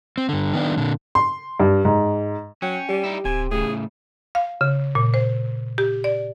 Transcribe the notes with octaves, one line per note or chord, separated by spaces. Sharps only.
C4
G2 D3
D#3 B3 D4
A#2 D3
C6
G2
G#2
F#3 C#4 G5
G3 G4
D#4 E4
D1 C3 G#5
A2 C#3 G#4
F5
C#3
A#2
C5
G4
D5